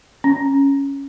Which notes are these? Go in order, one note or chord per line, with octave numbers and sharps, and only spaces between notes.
C#4